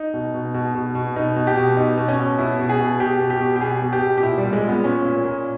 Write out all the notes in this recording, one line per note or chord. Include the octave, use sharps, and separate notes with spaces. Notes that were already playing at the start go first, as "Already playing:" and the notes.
Already playing: D#4
B2
B2
B2
B2
B2
B2 D#4
B2
G4
B2
B2 D#4
B2
C#4
B2
B2 E4
B2
G#4
B2
B2 G4
B2
G4
B2
G4
B2 G#4
B2
G4
B2
G4
A#2 E4
G3
A#2
G#3
A#2
B3
A#2 C#4
A#2
A#2